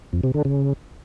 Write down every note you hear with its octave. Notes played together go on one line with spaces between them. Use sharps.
F2
C3
D3
C#3